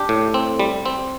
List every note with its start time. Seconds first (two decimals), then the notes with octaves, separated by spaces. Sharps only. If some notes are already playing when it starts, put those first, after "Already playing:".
Already playing: D4 G4
0.09 A2
0.34 C4
0.60 G3
0.86 C4